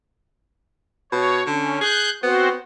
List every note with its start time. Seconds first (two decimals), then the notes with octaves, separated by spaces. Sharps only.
1.12 B2 C#5
1.47 D3 C#4
1.81 G#4 F#6 G6
2.23 B3 C4 F#4 C5